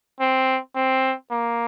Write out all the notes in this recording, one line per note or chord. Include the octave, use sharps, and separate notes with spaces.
C4
C4
A#3